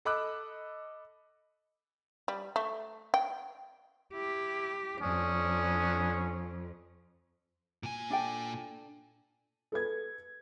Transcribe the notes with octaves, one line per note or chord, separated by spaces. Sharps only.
A4 D#5 B5 D6 E6 F#6
G3
A3
G5
E4 G4
F2 C#4 D4 D#6
A#2 G#5
D4 A4 G5
A4 B4 G#6